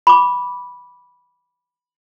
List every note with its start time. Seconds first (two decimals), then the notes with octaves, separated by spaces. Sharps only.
0.07 B5 D6